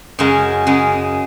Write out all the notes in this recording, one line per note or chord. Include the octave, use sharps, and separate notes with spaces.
F#2 C#3 G#3
F#2 C#3 G#3